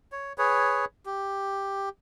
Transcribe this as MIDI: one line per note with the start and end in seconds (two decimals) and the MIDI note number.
0.12 0.33 73
0.38 0.85 68
0.38 0.85 71
0.38 0.85 73
1.06 1.89 67